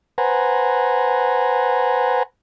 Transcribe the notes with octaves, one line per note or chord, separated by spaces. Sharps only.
B4 C5 F#5 G#5 A#5